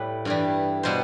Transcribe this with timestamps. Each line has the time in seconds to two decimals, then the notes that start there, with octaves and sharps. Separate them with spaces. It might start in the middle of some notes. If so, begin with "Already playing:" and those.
Already playing: A2 G3 B4
0.25 G2 E3 G3
0.83 B2 G3 C5